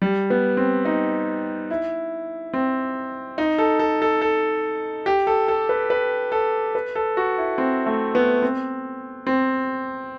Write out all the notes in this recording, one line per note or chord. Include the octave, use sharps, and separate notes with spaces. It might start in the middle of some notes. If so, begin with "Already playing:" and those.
G3
B3
C4
D#4
E4
C4
D#4
A4
A4
A4
A4
G4
A4
A4
B4
B4
A4
B4
A4
F#4
E4
C4
A3
B3
C4
C4